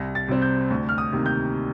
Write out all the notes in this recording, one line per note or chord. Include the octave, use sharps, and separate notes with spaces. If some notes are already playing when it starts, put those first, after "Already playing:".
Already playing: C2 A#6
A6
C3 G3 C4
G6
D2
F6
D#6
C3 D#3 A#3
G6